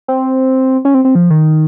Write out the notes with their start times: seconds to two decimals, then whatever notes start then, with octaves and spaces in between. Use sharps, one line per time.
0.08 C4
0.85 C#4
0.94 C4
1.05 C4
1.15 F3
1.30 D#3